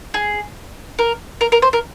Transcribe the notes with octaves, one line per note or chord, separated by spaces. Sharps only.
G#4
A#4
A#4
A#4
C5
A#4